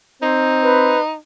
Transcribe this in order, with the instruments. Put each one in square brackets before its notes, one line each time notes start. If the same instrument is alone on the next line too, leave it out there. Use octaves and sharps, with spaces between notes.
[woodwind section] C4 C5 [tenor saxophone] D#4
[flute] B4